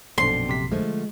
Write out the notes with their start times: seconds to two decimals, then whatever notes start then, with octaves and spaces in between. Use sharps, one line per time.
0.18 A#1 F#2 B2 C4 D4 C6
0.49 C3 B6
0.72 D3 F3 G#3 A3